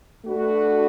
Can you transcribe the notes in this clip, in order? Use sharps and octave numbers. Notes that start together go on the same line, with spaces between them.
A3 D4 F#4 B4